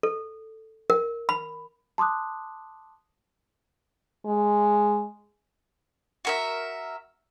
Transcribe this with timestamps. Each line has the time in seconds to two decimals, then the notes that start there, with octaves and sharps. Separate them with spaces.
0.03 A4
0.90 A#4
1.29 B5
1.98 A5 C6 D6 D#6 F#6
4.26 G#3
6.25 F#4 A#4 E5